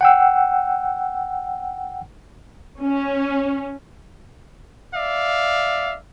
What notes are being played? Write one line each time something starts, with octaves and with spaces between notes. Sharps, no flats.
F#5 G5 E6
C#4
D5 E5 F5